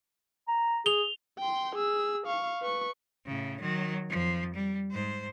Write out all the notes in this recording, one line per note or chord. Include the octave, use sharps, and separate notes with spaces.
A#5
G#4 F7 G7
G5 C6
G#4 E6
F5 C#6
B4 C#6
A2 C#3
D#3 F#3
F2 F3
G3
G#2 C5